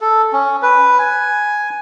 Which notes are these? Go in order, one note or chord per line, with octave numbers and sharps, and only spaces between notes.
A4
C#4
B4
G#5